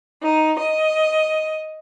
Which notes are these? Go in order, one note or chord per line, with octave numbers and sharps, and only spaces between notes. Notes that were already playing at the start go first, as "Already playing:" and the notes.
D#4
D#5